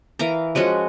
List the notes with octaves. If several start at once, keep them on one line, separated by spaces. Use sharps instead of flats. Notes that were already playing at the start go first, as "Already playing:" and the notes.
E3 A#4 F5 A#5
F3 G#3 C#4 F#4